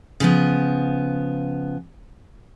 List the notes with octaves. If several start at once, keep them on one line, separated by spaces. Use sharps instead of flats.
C#3 F3 B3